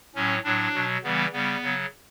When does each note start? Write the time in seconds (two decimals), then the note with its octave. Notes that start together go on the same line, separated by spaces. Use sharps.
0.15 A2 F#3 C#4
0.44 A2 F#3 D4
0.74 B2 F#3
1.03 C#3 E3 G3 B3
1.33 C#3 G3 B3
1.62 C#3 F#3